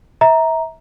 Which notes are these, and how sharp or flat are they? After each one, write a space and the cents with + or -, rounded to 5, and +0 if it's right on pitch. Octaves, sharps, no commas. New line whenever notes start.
E5 -30 A#5 +0